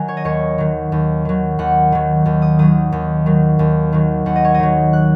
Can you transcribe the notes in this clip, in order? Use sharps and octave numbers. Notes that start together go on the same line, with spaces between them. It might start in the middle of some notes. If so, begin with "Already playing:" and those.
Already playing: D#3 F#3 G#5 A#5
C#5
D#5
D#2 C#5
D#3 F#3
D#2
D#3 F#3
D#2 F#5
D#3 F#3
D#2
D#6
D#3 F#3 D#6
D#2
D#3 F#3
D#2
D#3 F#3
D#2 F#5
D#5
C#5
D#5
D#3 F#3
F#6